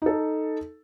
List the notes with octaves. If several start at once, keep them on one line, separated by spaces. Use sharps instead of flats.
D#4 A4